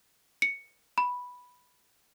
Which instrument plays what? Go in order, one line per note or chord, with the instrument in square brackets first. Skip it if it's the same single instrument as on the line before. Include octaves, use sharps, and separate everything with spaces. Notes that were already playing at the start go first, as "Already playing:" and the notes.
[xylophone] C#7
B5